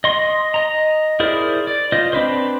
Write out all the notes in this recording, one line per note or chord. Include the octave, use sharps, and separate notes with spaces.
D#5 C6
D#5 A#5
E4 G#4 A#4 C5 D5
D5
F4 C5 D#5
C4 D4 B4 C5